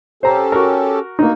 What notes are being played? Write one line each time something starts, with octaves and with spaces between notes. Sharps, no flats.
C#4 G4 A4 C5 A#5
F#4 A#4
A#3 D#4 F#4